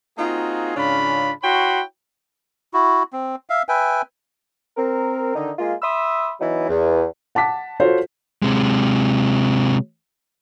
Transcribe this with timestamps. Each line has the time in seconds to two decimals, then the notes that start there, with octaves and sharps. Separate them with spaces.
0.17 A#3 C4 D#4 F4 F#4 G#4
0.76 G#2 C#3 C#4 D4 F4 B5
1.42 E4 F#4 C#5 G5 B5 C6
2.74 E4 F#4
3.13 C4
3.50 E5 F5
3.69 B4 E5 G5 G#5
4.77 C4 A#4
5.35 D3 D#3 D#4
5.59 G#3 A#3 F4
5.82 E5 B5 C6 D#6 E6
6.41 E3 F#3 B3 D#4 E4
6.68 E2
7.35 F#5 A5 D6 B6
7.80 F4 F#4 A4 C5 C#5
8.42 C3 G#3